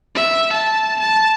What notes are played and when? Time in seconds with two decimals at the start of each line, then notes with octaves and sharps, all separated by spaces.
0.15 E5
0.52 A5
1.00 A5